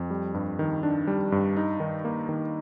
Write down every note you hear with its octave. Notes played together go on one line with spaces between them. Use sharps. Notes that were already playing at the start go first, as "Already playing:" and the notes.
Already playing: F2
G3
G2
D#3
D4
G3
G2
D#4
D#3
A#3
D#3